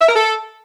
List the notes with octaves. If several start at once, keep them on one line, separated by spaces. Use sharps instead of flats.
E5
A#4
A4